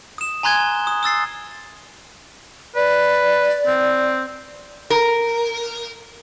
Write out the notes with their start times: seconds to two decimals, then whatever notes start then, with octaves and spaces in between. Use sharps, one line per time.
0.18 D#6 E7
0.43 G#5 A#5 C6 F#6 G#6 G7
0.87 D#6
1.03 D#6 E6 A6 C7
2.76 B4 D5
3.67 C4
4.90 A#4